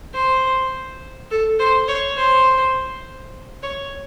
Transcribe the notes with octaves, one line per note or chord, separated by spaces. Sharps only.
C5
A4
C5
C#5
C5
C#5